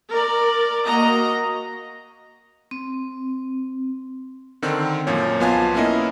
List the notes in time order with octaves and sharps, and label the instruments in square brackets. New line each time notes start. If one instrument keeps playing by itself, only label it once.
[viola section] A#4 D5
A#3 F#4 D#5 A#5
[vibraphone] C4
[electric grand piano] D3 D#3 C4
F#2 A#2 F3 C#5
B1 B3 F4 F5 G#5 A5
A#3 B3 C#4 E4 A#4 D#5